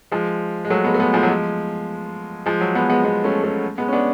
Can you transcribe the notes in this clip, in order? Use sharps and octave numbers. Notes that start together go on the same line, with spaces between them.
F3 G#3
G#3
F#3 A3
G#3 B3
A3
G#3 B3
F3 G#3
F#3
F3 G#3
F3 G#3
F#3
G#3 B3
G#3 B3
G#3 B3
A3 C#4
A3 C#4
G#3 B3
C#4
B3 D4